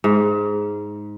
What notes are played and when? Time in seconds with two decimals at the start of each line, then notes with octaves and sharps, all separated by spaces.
0.04 G#2